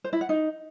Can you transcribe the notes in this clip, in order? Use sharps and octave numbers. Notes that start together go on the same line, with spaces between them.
C5
E4
F#5
D#4